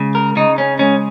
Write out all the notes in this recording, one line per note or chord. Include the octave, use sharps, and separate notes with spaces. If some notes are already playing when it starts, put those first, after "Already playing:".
Already playing: C#2 C#3
A#4
C#3 D#4
C#4
G#3 C#4